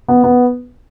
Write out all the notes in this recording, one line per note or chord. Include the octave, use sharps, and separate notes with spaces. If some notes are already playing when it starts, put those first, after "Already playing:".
B3
B3